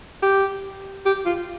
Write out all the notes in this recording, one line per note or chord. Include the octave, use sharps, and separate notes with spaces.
G4
G4
F4